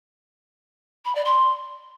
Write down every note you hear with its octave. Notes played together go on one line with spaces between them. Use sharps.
B5
D5
C6